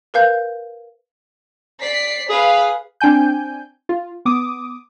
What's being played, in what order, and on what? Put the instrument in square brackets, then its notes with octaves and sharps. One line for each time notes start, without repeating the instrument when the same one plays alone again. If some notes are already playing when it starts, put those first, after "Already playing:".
[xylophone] A#4 B4 F5 G6
[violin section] D5 B6 C7
[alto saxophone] G#4 [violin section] B4 F5
[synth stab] C4 D4 G5 G#5 G6
F4
B3 D6 D#6